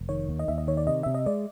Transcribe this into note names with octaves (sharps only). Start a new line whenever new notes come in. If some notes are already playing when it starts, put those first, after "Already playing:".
Already playing: F1
D#3 C#5
D#2
D#5
D#2 E5
D#5
D#3 C#5
D5
C3 D#5
C3 E5
D#5
G#3 D5